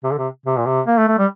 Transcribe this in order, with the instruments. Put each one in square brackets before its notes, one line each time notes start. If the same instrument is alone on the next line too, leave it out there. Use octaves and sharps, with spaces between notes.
[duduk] C3
D3
C3
C3
A#2
C3
A#3
A3
A3
G3